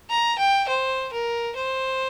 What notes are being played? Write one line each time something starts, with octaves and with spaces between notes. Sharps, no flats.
A#5
G5
C5
A#4
C5